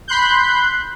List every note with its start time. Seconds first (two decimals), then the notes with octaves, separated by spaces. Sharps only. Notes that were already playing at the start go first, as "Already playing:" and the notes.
0.07 B5 C6 F#6 G6